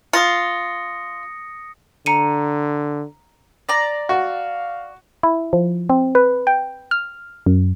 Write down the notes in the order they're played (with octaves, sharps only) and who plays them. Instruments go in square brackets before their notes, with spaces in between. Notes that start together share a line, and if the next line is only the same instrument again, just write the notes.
[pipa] F4 [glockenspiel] D#6 A#6 C#7
[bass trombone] D3 [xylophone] A#5 C#7 D#7
[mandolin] D5 A#5
[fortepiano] F#4 [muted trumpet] F5
[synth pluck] E4
F3
C4
B4
G5
F6
F#2